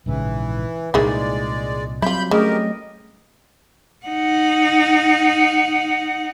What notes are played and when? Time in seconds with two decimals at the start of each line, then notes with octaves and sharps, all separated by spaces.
0.06 A#1 G#2 C#3 E3
0.94 C2 A#2 D#3 E3 G#3 G#4 D5
2.02 F#3 G3 C4 E4 F4 B5 G6
2.31 C#3 A3 G4 A#4 D#5
4.06 D#4 F#5